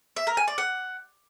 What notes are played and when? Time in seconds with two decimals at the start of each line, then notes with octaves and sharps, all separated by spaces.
0.16 E5
0.27 A#4
0.37 G#5
0.48 D5
0.58 F#5